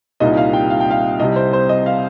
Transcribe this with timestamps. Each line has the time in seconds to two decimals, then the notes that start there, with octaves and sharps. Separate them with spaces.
0.20 C2 A#2 G3 D#4 D#5
0.37 F5
0.53 G5
0.70 F5
0.80 G5
0.91 F5
1.20 C2 C3 G3 D#5
1.36 C5
1.53 C5
1.69 D#5
1.86 F5